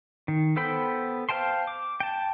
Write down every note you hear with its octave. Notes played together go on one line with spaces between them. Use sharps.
D#3
B3 A4 C5 G5 B5
C5 F5 G5 A5 C6
D6
G5 A5